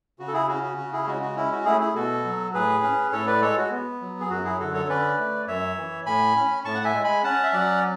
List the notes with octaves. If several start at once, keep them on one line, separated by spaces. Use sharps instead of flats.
C#3 F#4
A4
E4 G#4
C#4 F#4
F#4
C#3 F#4
E4 G#4
G#3 F#4
F#4
C#4 E4
F#4
A3 E4 G#4
E4 G#4
B2 F#4 A4
F#3
A2 G#4 B4
C#4
A2 A4 C#5
B4 D5
G#3 A4 C#5
F#4
B3
F#3
G#4
F#2 F#4
E4 G#4
D3 F#4 A4
A4 C#5
C#4 B4 D5
A3
F#2 C#5 E5
E3
A2 G#5 B5
C#4
A2 A5 C#6
F#5
E5 G#5
G#3
G#5 B5
C#4 F#5 A5
E5
F#3 D5 F#5